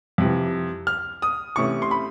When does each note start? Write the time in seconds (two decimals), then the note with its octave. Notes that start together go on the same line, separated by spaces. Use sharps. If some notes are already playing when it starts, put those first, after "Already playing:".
0.18 F2 C3 E3
0.87 F6
1.22 D#6
1.56 C3 E3 A3 C#4 C#6
1.82 C6
1.91 B5